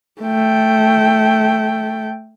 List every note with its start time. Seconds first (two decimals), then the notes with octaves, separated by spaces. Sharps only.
0.22 A3 G5